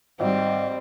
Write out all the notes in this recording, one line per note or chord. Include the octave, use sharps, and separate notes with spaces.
G#1 G3 C4 D#5